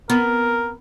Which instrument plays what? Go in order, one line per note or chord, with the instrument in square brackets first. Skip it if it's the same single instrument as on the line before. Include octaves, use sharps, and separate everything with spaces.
[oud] B3 [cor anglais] A#4